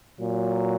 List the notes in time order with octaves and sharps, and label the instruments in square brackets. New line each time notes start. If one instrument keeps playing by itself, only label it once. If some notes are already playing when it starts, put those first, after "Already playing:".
[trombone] A#2 [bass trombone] F#3